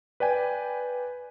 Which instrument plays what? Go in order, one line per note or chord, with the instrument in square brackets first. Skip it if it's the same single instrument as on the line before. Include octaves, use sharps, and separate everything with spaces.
[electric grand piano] B4 D5 G5 G#5